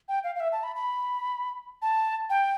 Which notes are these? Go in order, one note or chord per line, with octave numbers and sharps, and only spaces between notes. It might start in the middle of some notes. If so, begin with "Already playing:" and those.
G5
F5
F5
E5
A5
B5
B5
A5
G5